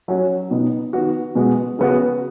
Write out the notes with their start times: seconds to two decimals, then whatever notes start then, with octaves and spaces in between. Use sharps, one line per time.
0.08 F#3 C#4 F#4
0.51 B2 B3 D#4
0.93 D#3 B3 F#4
1.35 B2 G#3 B3 F#4
1.79 C#3 B3 F#4